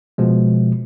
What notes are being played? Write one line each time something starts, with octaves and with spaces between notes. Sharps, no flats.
B2 F3 G#3